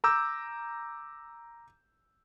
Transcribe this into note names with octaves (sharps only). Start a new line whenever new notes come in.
A#5 D6 E6 G6